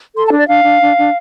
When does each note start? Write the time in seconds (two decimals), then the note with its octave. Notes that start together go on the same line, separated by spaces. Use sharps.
0.16 A4 C6
0.27 A5
0.32 D4
0.38 D5
0.48 D4 F5
0.64 D4
0.81 D4
0.97 D4